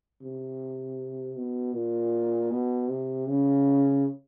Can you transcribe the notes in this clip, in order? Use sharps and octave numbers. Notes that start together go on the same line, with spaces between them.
C3
B2
A#2
B2
C3
C#3